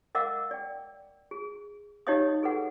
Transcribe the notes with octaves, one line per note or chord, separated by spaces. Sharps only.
A#4 D#5 F5 F#5 D6 E6
D5 G5
G#4
D#4 G4 C#5 D#5 F5 D#6
G#4 A4 B4 F#5